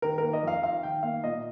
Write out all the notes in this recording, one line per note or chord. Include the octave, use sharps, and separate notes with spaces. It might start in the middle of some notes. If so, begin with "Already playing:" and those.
D#3 A#4
A#3 A#4
D#5
F2 F5
D#4 F5
D#3 G5
A#3 F5
A#2 D#5